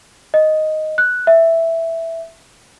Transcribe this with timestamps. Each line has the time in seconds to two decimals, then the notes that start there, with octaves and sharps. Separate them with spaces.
0.34 D#5
0.98 F#6
1.27 E5